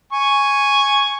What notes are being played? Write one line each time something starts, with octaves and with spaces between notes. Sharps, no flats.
G#5 C#6